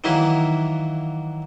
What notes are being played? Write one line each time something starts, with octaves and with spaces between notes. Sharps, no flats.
D#3 E3 F#3 A#3 E4